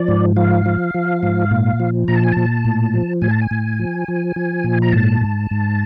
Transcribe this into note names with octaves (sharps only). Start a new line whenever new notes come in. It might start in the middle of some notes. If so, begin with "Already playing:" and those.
Already playing: F3 D5
G#2
F3 F5
F3
F3
G#2
A#2
F3
A#2 A#5
A5
G#5
A#2 A5
A2
F3
A2 G#5
A5
G#5
A2
F3
F3
F3
A#2
A#5
G#2 A5
G#2
G#2